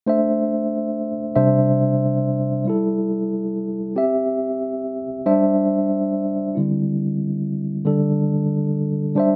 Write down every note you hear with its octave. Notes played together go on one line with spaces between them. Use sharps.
A3 D4 C5 E5
C3 G3 D4 C5 E5
G3 E4 A4
C4 G4 E5
G3 D4 C5 E5
D3 G3 C4 E4
D3 G3 D4 A4
G3 D4 C5 E5